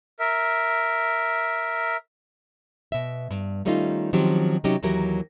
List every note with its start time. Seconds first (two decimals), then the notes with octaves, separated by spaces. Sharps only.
0.19 A#4 E5
2.92 B2 E5
3.31 G2
3.65 D#3 G3 A3 C#4 D#4 F4
4.13 D#3 F3 F#3 C4 C#4 G4
4.64 C3 F#3 C#4 D#4 G4
4.83 D#2 E3 F#3 G4 A#4